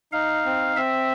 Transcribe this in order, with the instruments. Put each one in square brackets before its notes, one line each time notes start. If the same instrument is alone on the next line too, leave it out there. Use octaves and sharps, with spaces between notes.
[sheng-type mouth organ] D#4 [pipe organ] F5
[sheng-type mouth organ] C4
[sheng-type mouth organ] C4 [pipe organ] E5